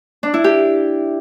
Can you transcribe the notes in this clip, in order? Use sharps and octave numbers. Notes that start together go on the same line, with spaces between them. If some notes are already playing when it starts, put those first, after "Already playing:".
D4
E4
G4